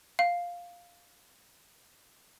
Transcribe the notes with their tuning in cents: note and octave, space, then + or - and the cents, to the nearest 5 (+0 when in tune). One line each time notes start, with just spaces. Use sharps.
F5 +5